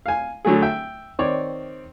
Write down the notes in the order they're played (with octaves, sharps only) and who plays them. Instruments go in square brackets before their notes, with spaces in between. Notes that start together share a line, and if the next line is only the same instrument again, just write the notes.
[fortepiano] F5 G#5
D3 F#3 A3 G#4
E5 G5
D#3 C4 C#5 D5